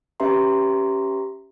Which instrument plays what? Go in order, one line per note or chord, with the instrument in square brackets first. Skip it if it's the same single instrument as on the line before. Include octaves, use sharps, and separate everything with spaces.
[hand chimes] C#4 G4 B4 E5 A#5 C6